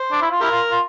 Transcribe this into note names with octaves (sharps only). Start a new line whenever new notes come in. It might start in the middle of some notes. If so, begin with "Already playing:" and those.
Already playing: C5
D4
E4
F4
E4 G4 A#4
F4
F4